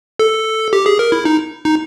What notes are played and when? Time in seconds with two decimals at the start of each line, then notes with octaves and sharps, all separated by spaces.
0.19 A4
0.73 G4
0.86 G#4
0.99 A#4
1.12 E4
1.25 D#4
1.65 D#4